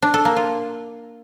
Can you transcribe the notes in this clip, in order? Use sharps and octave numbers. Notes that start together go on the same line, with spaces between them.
D4
A4
A#3
F4